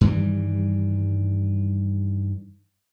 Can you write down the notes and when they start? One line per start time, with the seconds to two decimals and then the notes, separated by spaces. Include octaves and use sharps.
0.01 G2 D#3 E3 G3